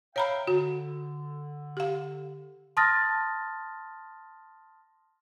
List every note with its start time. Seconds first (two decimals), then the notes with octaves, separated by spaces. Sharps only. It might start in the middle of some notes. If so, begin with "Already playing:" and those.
0.16 C#5 E5 F5 G5 A#5 B5
0.47 D3 F#4
1.77 G4 F5
2.77 A5 C6 D#6 F6 A6 A#6